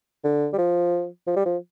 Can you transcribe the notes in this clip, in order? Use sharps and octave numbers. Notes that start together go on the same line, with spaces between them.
D3
G3
F3
F3
G3
F3